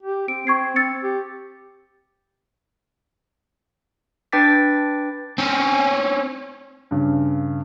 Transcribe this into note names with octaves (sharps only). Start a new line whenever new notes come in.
G4
C4 D7
C4 C#6 G#6 C7
C4 E6 A6 C#7
G4
D4 B4 G5 D6 A6 B6
C4 C#4
G2 C#3